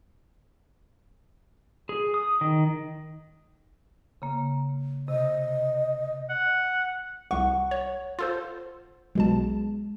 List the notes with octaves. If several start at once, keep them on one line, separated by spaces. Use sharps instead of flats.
G#4
D#6
D#3
C#3 A#3
C3 D#5
F#5
C2 F#5 C#6
C#5
F4 A4 C5
B1 B2 G#3 A5